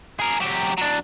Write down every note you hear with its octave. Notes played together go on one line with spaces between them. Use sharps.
G#4 A#4
F#3 G4
F#3 D4